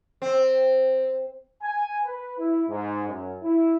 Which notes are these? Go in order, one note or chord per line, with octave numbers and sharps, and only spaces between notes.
C4
G#5
B4
E4
G#2
F#2
E4